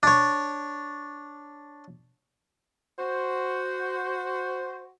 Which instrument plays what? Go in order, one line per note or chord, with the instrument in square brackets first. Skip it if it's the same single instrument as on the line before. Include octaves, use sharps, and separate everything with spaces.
[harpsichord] D4 C#5
[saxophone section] F#4 C5